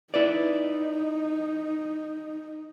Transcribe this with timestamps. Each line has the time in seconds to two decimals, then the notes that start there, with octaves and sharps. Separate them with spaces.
0.14 D#4 E4 B4 D5